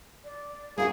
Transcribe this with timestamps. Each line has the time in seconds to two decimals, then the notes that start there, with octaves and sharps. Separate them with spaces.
0.25 D5
0.78 A#3 F4 F#4 G#4